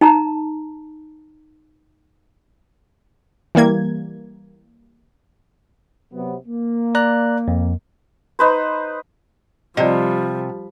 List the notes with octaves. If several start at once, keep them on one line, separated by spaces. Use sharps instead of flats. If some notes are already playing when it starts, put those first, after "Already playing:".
D#4 A5 A#5
E3 G3 A#3 G#6
C3 F#3 B3
A#3
D5 A#5 F#6
F2
D#4 B4 C5
C3 F3 G3 D5 D#5